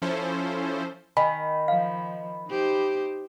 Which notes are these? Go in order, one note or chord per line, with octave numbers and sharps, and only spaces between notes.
F3 C#4 E4 A4 C5
D#3 G#5 B5
F3 F5
D#4 G4 C5